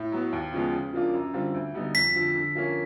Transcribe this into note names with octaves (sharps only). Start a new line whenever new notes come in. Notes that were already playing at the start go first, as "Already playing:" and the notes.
Already playing: A2
F#3 B3
D#2
C#3 F3 G#3 B3
C#3
F3 A#3 D4 F4
F#2
D3 G3 C4 F4
D2
D3 G3 B3 D#4
F2 B6
D3 F3
D3
F3 A#3 C#4